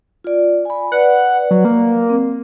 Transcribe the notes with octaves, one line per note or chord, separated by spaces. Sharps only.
F4 D5
G#5 B5
B4 D5 F#5
F#3
A#3
C4